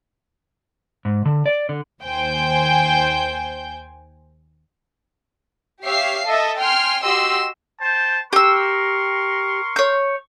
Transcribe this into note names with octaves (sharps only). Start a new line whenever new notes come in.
G#2
D3
D5
D3
D#2 C5 G5 G#5 G6
G4 C#5 E5 F5 C7
A4 D#5 E5
G5 G#5 C6 F6
F#4 G4 D#5 C6 E6
C5 G5 A5
G4 A#4 C6 C#6 E6
C#5 G6